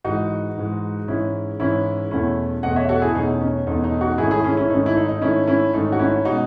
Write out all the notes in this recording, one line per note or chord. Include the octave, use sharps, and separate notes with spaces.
G#2 E3 G#3 D#4 F#4
G#2 E3 G#3
G#2 E3 G#3 C#4 E4
G#2 E3 G#3 C#4 E4
E2 B2 A3 C#4 E4
E2 B2 A3 C#4 D#5 F#5
C#5 E5
F#4 A4
E4 G#4
E2 B2 A3 C#4 D#4
C#4
E2 B2 A3 C#4 D#4
D#4
D#4 F#4
G#2 D#3 A3 C#4 E4 G#4
E4 G#4
C#4 E4
C#4 E4
G#2 D#3 A3 C#4 D#4
E4
D#4
D#4
G#2 D#3 A3 C#4 E4
C#4 E4
G#2 D#3 A3 C#4 D#4
F#4
C#4 E4
B2 G#3 D#4 F#4